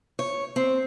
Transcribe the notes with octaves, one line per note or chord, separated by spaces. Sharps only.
C#5
C4